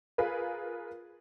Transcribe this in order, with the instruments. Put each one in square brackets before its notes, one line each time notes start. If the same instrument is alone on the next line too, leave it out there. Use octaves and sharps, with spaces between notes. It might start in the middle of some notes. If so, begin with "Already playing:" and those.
[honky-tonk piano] F4 G#4 A#4 B4